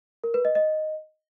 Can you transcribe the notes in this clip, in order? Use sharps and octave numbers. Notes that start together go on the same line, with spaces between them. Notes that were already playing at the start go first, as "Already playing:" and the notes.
A#4
B4
D#5
D#5